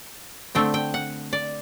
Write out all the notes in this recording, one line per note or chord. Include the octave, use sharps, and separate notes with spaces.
D3 A3 C4 G5
G5
F#5
D5